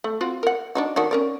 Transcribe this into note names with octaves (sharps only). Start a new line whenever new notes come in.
A3
C4 F4 F#4
A#4 F#5
D4 D#4 F#4
D#3 D4 F#4
C#4 A#4 D5